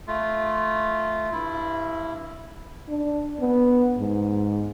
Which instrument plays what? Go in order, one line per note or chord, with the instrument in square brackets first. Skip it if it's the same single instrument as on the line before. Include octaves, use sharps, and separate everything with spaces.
[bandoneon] A3 F4
G2 E4
[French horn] D4
B3
G#2